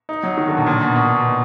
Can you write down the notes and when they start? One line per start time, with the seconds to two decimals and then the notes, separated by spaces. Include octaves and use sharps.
0.09 D#4
0.23 F#3
0.37 D#3
0.48 D3
0.57 B2
0.66 A#2
0.81 B2
0.96 B2